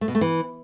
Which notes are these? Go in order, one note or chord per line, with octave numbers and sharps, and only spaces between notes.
A3
B2
A3
E3